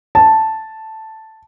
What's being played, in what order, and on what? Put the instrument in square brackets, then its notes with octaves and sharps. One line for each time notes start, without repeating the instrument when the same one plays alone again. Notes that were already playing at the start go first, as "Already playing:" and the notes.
[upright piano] A5